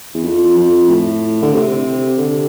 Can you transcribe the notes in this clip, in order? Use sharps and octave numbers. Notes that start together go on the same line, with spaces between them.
E2
F2
F2
A2
D3
C3
D3